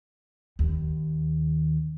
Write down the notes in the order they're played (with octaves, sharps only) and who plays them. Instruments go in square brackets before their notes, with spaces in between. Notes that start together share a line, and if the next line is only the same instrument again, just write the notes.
[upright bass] D#2